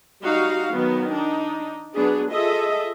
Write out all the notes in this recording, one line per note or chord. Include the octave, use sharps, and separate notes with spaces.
G3 D#4 F#4 F5
D#3 F#3 B3
D4 D#4
F#3 B3 D4 G#4
F4 G#4 A4 D#5 E5